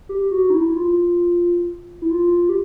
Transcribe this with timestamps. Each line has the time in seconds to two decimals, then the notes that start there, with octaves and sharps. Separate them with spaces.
0.09 G4
0.31 F#4
0.50 D#4
0.54 E4
0.72 E4
0.77 F4
2.02 E4
2.11 F4
2.49 G4